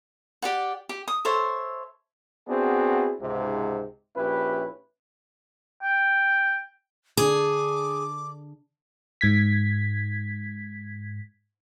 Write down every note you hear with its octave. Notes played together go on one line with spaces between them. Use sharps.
G4 D5 F#5
G4
D#6
A4 C5 C#5 E5
B3 C4 D4 E4 F#4 G#4
C#2 G#2 C3
A#1 C#4 E4 G4 B4
G5
D3 D4 G#4 D6
G#2 G#6 B6